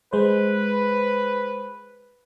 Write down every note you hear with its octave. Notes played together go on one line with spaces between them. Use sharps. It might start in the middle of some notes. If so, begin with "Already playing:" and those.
G#3 B4 C5